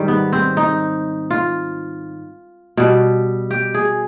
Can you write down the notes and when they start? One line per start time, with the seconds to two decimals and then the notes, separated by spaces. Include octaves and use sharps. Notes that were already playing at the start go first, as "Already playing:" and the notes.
Already playing: G#2 D#3 G3
0.08 B3
0.33 C4
0.57 D#4
1.31 F4
2.77 B2 G3
3.51 G4
3.75 G#4